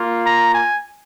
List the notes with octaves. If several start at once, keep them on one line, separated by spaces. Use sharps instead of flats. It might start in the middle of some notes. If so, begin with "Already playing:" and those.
Already playing: A#3 F4
A#5
G#5